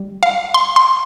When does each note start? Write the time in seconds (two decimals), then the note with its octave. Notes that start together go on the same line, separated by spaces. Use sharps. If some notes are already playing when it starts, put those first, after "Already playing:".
Already playing: G3
0.23 F5
0.54 C6
0.76 C6